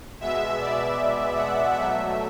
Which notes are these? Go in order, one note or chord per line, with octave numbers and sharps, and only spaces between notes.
B2 G#3 B3 E5
D5
F#5
B2 F#3 A3 E5